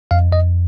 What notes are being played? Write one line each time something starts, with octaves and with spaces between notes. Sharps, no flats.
F2 F5
F2 D#5